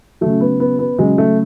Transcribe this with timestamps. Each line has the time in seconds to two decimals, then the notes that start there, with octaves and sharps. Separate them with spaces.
0.21 C#3 F#3 A3
0.41 B3
0.60 B3
0.79 B3
0.98 C#3 F#3 G#3
1.18 A3